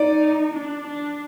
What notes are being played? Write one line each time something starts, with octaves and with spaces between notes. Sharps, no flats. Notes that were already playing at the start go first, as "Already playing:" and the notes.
Already playing: D#4 D5
D4
D4